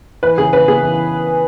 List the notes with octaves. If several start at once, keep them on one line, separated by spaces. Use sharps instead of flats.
E3 B4
C#3 G#4
C#3 B4
B3 G#4
E3